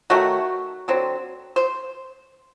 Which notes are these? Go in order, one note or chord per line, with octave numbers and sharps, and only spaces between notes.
D#3 F#3 A3 F#4
D3 F#3 C4
C5